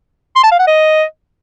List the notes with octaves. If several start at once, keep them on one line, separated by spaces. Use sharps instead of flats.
C6
A5
F5
F#5
D#5